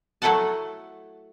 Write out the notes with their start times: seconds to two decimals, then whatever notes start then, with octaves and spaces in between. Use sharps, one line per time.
0.22 F#3 A3 E4 A4 F#5 A5